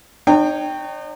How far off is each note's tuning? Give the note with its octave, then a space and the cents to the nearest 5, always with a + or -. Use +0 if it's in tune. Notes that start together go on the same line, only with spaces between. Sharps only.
D#4 -45 C#5 +0 G5 +0